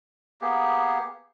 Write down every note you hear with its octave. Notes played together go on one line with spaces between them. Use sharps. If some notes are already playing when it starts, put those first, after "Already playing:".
A#3 B3 G4 G#4